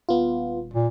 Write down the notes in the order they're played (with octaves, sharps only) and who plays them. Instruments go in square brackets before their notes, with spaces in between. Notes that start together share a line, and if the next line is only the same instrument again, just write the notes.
[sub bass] D#1 [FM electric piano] B3 F4
[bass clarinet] A#2